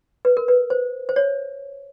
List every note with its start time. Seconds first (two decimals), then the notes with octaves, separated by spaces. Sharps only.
0.25 B4
0.37 A#4
0.48 B4
0.70 C5
1.09 C5
1.16 C#5